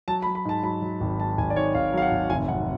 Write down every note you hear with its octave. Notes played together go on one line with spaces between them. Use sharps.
F#3 A5
B5
F#3
B5
G#2 A5
F#3 B5
F#3
G#1
G#2 A5
G#1 G#5
D5
G#2 C#5
G#1 F5
F#3 F5
F#5
G#1
F1 G#5
F#3 F#5